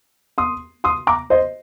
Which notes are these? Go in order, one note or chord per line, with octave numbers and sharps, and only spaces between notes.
C6 D#6
C6 D#6
A#5 D6
C5 D#5